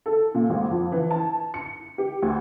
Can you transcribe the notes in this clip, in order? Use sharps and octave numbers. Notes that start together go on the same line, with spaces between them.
A4
A#2
G#1
F2
E3
A5
C#7
G4
D2